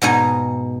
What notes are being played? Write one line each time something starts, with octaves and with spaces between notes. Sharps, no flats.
G#2 B2 D#4 G#5